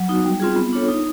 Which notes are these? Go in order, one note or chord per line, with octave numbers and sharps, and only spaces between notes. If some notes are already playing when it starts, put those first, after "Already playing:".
Already playing: F#3
B3 D#4 F#4
G3
C4 F4 G#4
B3
D4 F4 A4 C#5
D#4